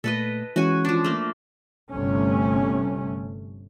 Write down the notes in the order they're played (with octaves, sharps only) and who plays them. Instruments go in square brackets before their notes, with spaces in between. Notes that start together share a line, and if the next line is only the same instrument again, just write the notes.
[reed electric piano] A#2 A3 [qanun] A4 B4 D#5
[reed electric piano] E3 G#3 C#4 [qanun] F#4 G#5
[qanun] F3 D4
A3 A#3
[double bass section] G1 C3 A3 C#4